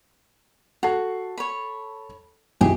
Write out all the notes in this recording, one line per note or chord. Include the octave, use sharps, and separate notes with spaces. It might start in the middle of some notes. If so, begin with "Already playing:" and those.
F#4 A4 A5 C7
C#5 B5
B1 F#2 E4 G4 G#4 G5